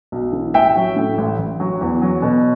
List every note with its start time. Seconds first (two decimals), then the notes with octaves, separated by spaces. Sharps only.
0.12 B1
0.33 E3
0.54 A1 E5 G5
0.76 F#3
0.96 A2
1.18 A1
1.38 A1
1.60 F#3
1.81 E2
2.02 F#3
2.22 B2